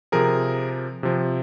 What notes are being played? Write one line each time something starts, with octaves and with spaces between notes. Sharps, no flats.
C3 F3 G#4 A#4
C3 F3